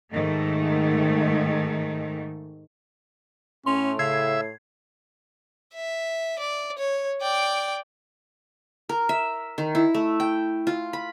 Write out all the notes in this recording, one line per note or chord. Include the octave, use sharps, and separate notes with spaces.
G#2 D#3 A3
A2 C#4 C6 F7
C#3 E5 G#6 C7
E5
D5
C#5
D5 G5
A#4
E5
D#3
E4
A3
G5
F4
B5